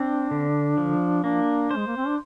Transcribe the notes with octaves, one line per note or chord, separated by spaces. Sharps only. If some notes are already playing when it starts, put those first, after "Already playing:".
Already playing: C4 D4
D3
F3
A#3 D4
C5
G#3
A#3
C4
D4